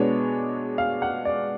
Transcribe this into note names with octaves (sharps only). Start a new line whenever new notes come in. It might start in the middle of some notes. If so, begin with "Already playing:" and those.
Already playing: B2 G#3 B3 D4 C#5
F5
F#5
D5